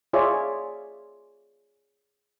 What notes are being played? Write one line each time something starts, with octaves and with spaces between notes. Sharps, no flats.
F4 G#4 C#5 D5 E5